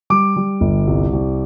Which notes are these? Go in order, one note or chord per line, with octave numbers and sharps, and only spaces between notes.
G3 D6
G3
G1
C2
C2